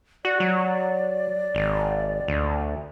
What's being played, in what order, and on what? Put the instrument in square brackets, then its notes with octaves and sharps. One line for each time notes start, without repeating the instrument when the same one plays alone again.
[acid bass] F#4 [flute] D5
[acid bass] F#3
G#1
D2